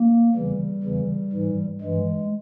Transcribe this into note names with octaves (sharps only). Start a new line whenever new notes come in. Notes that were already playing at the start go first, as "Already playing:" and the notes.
Already playing: A#3
E2 C#3 E3 G3
E2 C#3 E3
G#2 E3
G2 E3 G#3